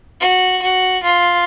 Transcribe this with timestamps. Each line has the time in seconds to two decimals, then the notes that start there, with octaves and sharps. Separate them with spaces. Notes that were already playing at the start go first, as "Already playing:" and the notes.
0.21 F#4
0.62 F#4
1.03 F4